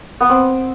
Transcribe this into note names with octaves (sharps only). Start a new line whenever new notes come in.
B3
C4